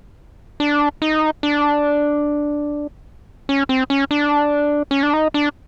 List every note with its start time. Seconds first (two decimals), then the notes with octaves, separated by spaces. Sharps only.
0.60 D4
1.02 D#4
1.43 D4
3.49 C#4
3.69 C4
3.90 C#4
4.11 D4
4.91 C#4
5.03 D4
5.14 D#4
5.34 D4